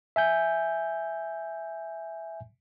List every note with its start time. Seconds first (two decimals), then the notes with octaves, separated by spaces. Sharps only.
0.16 E5 G#5 G6